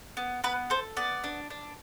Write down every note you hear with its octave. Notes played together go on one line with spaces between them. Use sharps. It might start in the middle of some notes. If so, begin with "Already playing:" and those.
B3
B3 B4
A4 C5
B3 D5
D4
D4